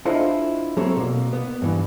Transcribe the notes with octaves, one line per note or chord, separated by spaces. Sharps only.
D4 E4 F4 A4 C5 D#5
F#3 A#3 C4 A4 C#5
B2 A#3
B3
G2 E3